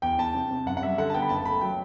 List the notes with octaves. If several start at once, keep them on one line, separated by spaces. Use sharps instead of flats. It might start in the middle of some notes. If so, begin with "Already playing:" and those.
E2 G5
E2 A5
C3
C3
F#2 F#5
F#5
G3 E5
D3 F#5
A5
B3 G5
B5
F#1 A5
A3 B5
F#3 G5